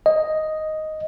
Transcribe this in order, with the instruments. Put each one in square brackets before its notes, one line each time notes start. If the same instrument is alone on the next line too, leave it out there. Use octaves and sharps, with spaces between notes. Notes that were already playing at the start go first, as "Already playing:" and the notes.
[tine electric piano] D#5